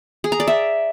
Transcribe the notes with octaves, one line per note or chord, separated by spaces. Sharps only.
G#4
A#5
D5
E5